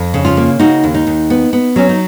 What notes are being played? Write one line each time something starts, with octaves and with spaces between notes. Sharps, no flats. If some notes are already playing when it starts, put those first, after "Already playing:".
Already playing: F2
C#3
C#4 F4
A#3
C#3 D#4 F#4
D#2
D#4
D#2
B3
B3
F#3 C#4
D#4